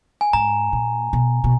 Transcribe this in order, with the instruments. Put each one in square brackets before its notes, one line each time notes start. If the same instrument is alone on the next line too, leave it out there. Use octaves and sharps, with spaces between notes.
[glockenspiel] G#5
[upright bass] G#2 [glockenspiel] A#5
[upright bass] A#2
B2
B2